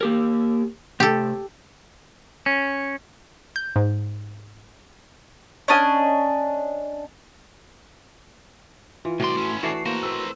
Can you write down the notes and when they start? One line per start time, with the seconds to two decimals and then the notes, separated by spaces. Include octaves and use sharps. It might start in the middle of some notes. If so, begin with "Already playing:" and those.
0.01 A#3 G4 A#4
1.00 C3 A3 G4 A4
2.46 C#4
3.56 G6
3.76 G#2
5.68 C#4 D4 D#5 G#5
9.05 E3 F4
9.20 C2 A2 F#4 D5 C6
9.37 C#4 E4
9.63 E3 A3 F#4 D5 C7
9.86 A#3 F#4 A#4 C5
10.03 C4 B4 E6